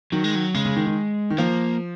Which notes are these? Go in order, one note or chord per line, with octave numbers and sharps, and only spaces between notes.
D#3 F#3
G#3
F#3
C#3 G#3
C#3
D#3
D#3
D#3
F3 A#3